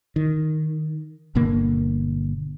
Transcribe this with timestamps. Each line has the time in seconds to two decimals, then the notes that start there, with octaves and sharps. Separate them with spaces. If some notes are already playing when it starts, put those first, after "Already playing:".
0.16 D#3
1.35 G1 B2 D3 A#3